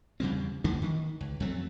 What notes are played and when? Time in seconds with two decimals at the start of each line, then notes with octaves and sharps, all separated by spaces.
0.20 E2 C#3 G3 C4
0.64 E2 D3 A#3 D4
0.82 D#3
1.21 C#2
1.40 F2 F#3 A3 C4